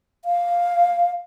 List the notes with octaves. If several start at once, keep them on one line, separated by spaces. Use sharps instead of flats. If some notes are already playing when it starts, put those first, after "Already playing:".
F5